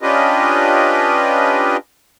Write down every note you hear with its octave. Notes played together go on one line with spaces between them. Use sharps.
C#4 D4 F4 G4 B4 D#5